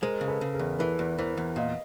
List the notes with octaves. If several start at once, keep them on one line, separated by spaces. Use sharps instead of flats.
G#3 A#4 C5
C#3
A4 B4
C#3
G#4 A#4
E2
E3 A4 B4
E2
E3 A#4 C5
E2
A#2 D#5 F5